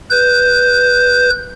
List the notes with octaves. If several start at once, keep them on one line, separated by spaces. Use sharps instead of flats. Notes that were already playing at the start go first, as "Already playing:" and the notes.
B4 G6